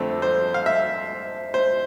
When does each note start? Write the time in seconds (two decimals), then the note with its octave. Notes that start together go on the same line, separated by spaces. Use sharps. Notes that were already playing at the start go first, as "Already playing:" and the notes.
Already playing: F2 D3 A3 C4
0.22 C5
0.54 F5
0.66 E5
1.54 C5